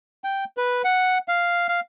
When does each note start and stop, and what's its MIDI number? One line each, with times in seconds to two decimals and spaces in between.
0.24 0.45 79
0.57 0.82 71
0.84 1.18 78
1.28 1.68 77
1.69 1.80 77